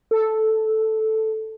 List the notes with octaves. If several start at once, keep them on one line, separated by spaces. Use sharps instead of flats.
A4